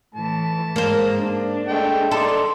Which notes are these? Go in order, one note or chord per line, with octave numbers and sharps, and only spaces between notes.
A2 E3 A5
G#2 A#3 C5
D4
G#3 A3 G5
D#4 A4 D5 C6